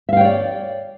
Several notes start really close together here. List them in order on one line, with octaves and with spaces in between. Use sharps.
E5 F5 G5 C#5 D5